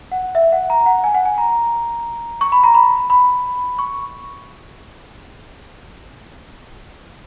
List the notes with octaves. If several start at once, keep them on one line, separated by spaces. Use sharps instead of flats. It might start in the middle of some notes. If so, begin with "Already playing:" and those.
F#5
E5
F#5
A#5
F#5
G#5
F#5
G#5
A#5
C#6
B5
A#5
B5
B5
C#6